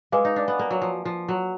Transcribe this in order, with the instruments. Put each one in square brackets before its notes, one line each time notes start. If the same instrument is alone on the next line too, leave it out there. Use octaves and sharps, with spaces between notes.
[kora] G#3 [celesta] B4 F5 G#5 D6
[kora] D#4
D4
B3
A#3
F#3
F3
F3
F#3